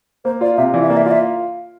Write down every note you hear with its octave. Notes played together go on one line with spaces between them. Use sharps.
A#3 C5
F4 D5
C3 E5
E3 D5
E5
A#3 D5
E5
F4 D5
E5